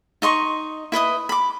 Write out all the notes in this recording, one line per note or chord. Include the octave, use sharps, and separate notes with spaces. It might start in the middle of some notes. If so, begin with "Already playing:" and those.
D#4 D#5 C6 C#6
E4 B4 D#5 D#6
B5 D6